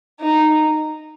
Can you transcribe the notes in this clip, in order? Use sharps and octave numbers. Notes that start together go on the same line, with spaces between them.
D#4